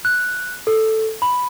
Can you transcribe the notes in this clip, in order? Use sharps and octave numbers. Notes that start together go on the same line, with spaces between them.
F#6
A4
B5